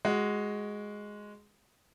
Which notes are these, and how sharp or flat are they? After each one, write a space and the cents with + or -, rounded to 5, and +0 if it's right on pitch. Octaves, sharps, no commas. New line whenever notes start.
G#3 +0 F#4 +0